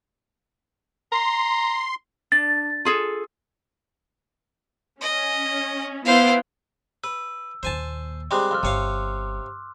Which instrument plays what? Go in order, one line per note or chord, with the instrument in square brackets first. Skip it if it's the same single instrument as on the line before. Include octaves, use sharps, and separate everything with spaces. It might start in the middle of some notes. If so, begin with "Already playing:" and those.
[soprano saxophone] A#5 [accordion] C6
[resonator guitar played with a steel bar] D4 [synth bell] A6
[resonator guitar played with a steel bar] F4 G#4 A4
[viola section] C#4 [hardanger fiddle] D#5
[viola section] B3 E4 G5 [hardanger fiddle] C5 F5
[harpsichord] B4 [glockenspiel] E6
[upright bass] D#2 A#2 [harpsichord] C5 G#5 A5
[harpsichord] G3 G#3 C4 [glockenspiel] C6 D6 F#6
[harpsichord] F2 [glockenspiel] C6 E6 F6
[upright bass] G1 [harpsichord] C3 C#5 F5